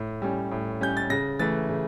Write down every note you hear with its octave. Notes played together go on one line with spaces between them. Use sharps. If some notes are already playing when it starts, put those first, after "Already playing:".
Already playing: A2
G3 C#4
A2
G3 C#4 G6
A6
C#3 A#6
E3 A3 A6
C#3